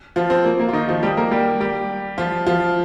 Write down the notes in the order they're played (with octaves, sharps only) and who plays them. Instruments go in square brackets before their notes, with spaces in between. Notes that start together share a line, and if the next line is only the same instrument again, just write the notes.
[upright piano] F3 F4
C4
A#3
A#3
F4
D#3 D#4
F3 F4
G3 G4
A#3 A#4
G3 G4
G3 G4
F3 F4
F3 F4